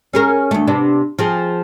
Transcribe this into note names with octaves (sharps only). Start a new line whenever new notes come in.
C#4 G#4 A#4
D2 A3
C3 B3 D4
F3 C4 G#4